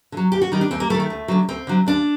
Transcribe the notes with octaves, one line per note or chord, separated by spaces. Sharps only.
D3
F#3
D#2 G4
F#4
D#3 G3 D#4
D4
D#2 C4
A#3
G3 A3
D#3
A3
D2
D3 F#3
D2 C4
D3 F#3
D#2 D4